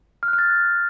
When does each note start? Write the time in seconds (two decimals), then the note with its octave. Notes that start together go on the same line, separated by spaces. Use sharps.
0.23 F6
0.28 F#6
0.33 F6
0.38 A6